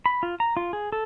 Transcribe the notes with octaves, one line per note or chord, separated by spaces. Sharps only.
B5
F4
A#5
F4
G#4
A4